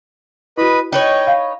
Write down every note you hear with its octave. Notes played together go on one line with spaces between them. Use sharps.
E4 F#4 B4 D#5 B5
D#4 B4 C#5 G5
F5